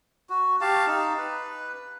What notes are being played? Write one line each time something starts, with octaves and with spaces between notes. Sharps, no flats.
F#4
G4 F5 A5
D#4
B4